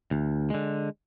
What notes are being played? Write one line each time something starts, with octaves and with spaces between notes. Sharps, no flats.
D2
D3 G#3